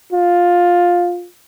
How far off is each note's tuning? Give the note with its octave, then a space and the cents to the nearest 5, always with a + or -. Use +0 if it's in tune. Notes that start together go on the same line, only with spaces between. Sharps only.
F4 +10